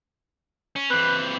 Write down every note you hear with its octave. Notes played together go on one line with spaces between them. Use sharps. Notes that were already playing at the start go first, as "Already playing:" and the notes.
C#4
E3 C4 B4